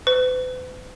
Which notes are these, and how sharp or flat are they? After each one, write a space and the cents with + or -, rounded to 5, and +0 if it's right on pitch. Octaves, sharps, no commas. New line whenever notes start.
B4 +45